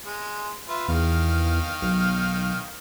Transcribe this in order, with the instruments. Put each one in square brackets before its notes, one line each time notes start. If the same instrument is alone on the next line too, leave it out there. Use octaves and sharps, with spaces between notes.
[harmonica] G#3
F4 B4 E5
[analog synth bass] E2 [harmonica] D#3 F5
[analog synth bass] B1